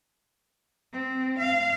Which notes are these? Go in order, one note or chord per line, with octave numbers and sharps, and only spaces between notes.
C4
F5